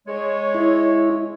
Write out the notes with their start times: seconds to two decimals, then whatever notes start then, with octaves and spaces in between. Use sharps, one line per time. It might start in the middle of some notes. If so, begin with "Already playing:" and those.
0.07 G#3 C#5
0.54 E4